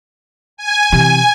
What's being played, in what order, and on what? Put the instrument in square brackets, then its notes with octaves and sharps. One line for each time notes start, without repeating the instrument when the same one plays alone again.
[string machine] G#5
[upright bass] C3 E3